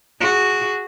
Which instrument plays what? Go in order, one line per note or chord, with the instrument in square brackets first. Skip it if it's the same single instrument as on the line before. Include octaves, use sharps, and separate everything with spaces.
[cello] F#4 G#4